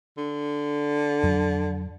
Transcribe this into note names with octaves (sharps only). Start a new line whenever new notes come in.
D3
F2 F#3